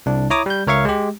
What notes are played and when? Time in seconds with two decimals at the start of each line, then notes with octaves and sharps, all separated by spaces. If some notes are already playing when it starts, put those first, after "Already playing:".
0.06 C2 D4
0.30 E4 C#5 A#5 D6 D#6
0.46 G3 G6
0.67 C#2 A#4 C#5 E5 F5 C#6
0.85 G#3 G4